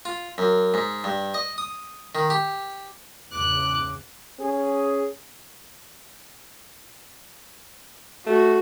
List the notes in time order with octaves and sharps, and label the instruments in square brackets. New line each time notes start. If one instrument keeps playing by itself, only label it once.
[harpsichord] F4
F#2
G#2
G2
D#5
D#6
D#3
G4
[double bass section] E2 G#2 C#3 [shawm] D6 [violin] F#6
[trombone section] C#4 G#4
[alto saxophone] A3 [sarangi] F#4